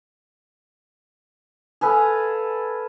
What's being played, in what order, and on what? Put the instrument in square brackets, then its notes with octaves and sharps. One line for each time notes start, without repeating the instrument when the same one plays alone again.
[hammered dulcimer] G#4 A4 B4 F5